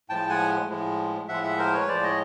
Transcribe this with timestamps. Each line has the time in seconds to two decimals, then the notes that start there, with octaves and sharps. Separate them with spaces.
0.09 A2 F3 G#3 G5 A5
0.30 F#5 G#5
0.69 A2 F3 G#3
1.28 A2 F3 G#3 E5 F#5
1.43 E5 F#5
1.59 A#4 C5
1.74 B4 C#5
1.88 A2 F3 G#3 C5 D5
2.03 C#5 D#5